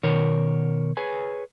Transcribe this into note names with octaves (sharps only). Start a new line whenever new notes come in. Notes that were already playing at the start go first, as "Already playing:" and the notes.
B2 D#3 A#4 C#5
G#4 B4 C#5 G#5